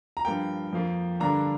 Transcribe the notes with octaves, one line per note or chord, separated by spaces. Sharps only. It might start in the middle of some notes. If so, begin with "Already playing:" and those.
A#5
G2 F3 A#3 G5
F2 F3 A#3
G2 D3 A#3 D4 A#5